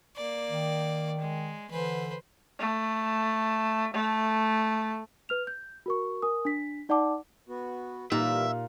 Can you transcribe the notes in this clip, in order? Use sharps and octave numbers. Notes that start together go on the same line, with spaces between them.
A#3 D5
D#3
G#3
D3 E3 B4 C5
A3
A3
B4 F6 F7
G6
F#4 A#4 C#6
A#4 G#5 D#6
D4 B6
D#4 D5 F#5 A5 D6
B3 F#4
A#2 E3 G3 A#3 D#4 G4 A#4 E5